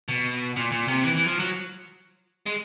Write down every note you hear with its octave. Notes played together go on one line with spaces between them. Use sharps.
B2
A#2
A#2
C3
E3
E3
F3
F#3
G#3